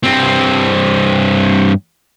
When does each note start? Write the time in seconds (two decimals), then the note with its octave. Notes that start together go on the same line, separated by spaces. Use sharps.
0.04 G2 C4